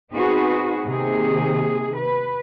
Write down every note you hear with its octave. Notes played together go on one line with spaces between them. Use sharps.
B3 C4 D#4 F#4 G#4 B4
C3 D#3 A#3 G#4
B4